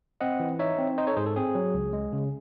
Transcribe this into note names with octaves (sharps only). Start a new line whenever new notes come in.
C4 D#5 F#5
E3
D#4 C#5 E5
C4
D#4 C5 D#5
A4 C#5
G#2 G#4 C5
A4
C4 G#4
F#3
C#2
G#3
C#3